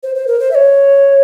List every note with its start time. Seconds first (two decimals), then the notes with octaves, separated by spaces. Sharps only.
0.03 C5
0.15 C5
0.27 A#4
0.40 C5
0.51 E5
0.55 C#5